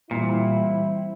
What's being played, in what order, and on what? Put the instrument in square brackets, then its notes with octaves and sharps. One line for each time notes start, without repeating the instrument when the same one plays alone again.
[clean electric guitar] A#2 [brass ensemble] E3 G3 C4 E4